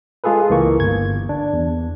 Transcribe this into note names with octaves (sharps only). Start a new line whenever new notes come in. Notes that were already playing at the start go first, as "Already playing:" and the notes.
G#3 F4 G#4 A4 B4
C#2 E3 A#3 C#6
G1 G#6
D4
E2